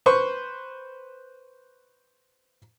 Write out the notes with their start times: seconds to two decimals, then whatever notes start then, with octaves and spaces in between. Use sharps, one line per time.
0.06 B4 C5 C#6